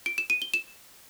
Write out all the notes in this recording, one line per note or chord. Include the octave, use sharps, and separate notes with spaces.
D7
E7
D#7
G7
E7